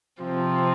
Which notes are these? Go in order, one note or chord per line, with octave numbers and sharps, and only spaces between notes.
C3 F3 C4